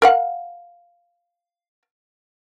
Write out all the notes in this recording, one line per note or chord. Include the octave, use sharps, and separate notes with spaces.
A#4 F5 F#5